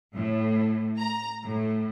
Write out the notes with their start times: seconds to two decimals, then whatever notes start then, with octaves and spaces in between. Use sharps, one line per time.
0.13 A2
1.00 A#5
1.45 A2